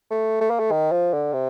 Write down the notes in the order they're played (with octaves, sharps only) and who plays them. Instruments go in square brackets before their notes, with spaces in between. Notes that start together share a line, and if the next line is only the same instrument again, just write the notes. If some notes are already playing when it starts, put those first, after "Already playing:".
[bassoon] A3
A3
A#3
A3
D#3
F3
D3
C3